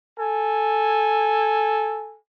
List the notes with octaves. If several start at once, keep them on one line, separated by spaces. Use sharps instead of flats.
A4 G#5